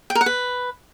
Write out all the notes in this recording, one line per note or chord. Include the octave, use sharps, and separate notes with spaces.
G5
A#4
F#5
B4